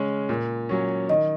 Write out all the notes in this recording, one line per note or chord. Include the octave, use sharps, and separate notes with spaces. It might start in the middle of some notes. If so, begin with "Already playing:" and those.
Already playing: C#3 G#3 C#4
A#2
F#3 C#4
D#3 D#5